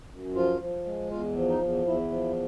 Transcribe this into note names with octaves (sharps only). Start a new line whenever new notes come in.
F#2
F3 F4
F3
G#3
E2 F4
F3
D#4
E2
E2 E4
F3